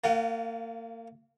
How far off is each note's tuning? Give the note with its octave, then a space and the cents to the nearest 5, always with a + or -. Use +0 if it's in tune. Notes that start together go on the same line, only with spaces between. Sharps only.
A#3 -35 F4 +0 F#5 +35